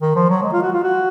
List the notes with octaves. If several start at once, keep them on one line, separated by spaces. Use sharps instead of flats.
D#3
F3
F#3
G#3
F4
F#4
F4
F#4